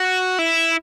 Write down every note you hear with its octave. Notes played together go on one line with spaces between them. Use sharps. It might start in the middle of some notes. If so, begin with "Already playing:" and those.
Already playing: F#4
E4